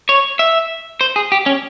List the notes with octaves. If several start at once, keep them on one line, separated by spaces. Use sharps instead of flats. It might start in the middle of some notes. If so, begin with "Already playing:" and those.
C#5
E5
C5
G#4
G4
C#4